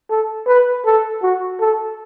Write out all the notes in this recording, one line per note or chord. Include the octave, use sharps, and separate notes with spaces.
A4
B4
A4
F#4
A4